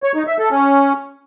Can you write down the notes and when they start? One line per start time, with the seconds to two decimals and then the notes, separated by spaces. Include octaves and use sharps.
0.03 C#5
0.15 D#4
0.27 E5
0.39 A4
0.51 C#4